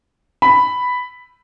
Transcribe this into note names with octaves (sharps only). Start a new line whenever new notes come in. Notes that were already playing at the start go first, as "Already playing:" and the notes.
B5